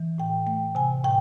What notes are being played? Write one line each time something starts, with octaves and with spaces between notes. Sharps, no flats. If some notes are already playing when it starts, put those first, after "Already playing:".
Already playing: E3
A2 G5
A3 G5
C3 G#5
A2 G5